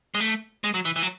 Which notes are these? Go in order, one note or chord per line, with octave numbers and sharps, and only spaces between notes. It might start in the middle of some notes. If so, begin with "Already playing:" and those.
G#3
A3
G#3
F#3
E3
E3
F#3